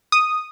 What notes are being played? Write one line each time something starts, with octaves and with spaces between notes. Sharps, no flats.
D#6